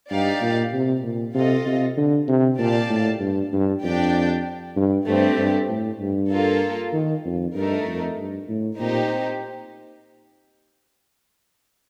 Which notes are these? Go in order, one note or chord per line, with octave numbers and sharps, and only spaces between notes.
G2 D#4 G4 D5 F5
A#2
C3
A#2
C3 F4 A4 D#5
C3
D3
C3
A#2 G4 D5 F5 A5
A2
G2
G2
F2 D4 G4 D5 G5
G2
G2 A3 C4 G4
G2
A2
G2
A#3 F4 A4
D#3
F2
G2 A3 D#4 A#4
F2
G2
A2
A#2 C4 D#4 G4 C5